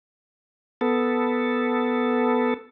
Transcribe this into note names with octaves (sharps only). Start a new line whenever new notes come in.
B3 A4